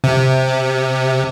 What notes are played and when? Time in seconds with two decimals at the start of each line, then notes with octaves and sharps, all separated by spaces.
0.04 C3